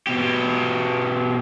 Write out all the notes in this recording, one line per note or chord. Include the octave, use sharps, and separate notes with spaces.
B2 G4